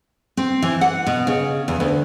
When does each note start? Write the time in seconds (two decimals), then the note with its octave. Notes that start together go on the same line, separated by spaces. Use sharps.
0.37 C4
0.62 E3
0.81 F#5
1.06 B2
1.27 C#3
1.68 E2
1.80 D2